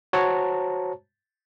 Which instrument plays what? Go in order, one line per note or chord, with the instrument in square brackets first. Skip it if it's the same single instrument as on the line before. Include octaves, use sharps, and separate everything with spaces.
[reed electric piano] F#4 C5 C#5 A5 A#5